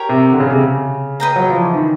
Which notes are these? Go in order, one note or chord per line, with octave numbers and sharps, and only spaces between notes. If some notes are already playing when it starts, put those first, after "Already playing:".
Already playing: G4 A#4 C#5
C3
D3
C#3
C3
C#3
B4 D#5 G5 A#5
F#3
F3
E3
D#3